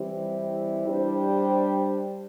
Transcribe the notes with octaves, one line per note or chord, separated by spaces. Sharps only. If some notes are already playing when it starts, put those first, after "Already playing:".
Already playing: E3 G3 C4 E4
G3 D4 G4 C5